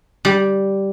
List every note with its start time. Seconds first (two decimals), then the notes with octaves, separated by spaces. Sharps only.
0.25 G3